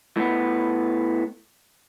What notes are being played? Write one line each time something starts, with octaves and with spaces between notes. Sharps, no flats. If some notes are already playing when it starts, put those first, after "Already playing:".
A2 B3